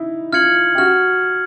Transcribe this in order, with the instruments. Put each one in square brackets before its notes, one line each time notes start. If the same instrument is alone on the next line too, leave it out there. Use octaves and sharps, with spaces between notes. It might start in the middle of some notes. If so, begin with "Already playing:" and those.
Already playing: [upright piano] D#4 E4
[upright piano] F4 [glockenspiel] F6 G#6 C#7 F#7
[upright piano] G4
[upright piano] F#4 [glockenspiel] F6